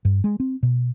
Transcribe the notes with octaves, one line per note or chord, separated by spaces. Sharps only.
G2
G#3
C4
B2